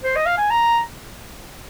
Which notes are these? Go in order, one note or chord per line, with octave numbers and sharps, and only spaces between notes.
C5
D#5
F5
G#5
A#5